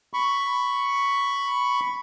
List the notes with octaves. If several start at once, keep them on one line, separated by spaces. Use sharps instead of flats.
B5 C#6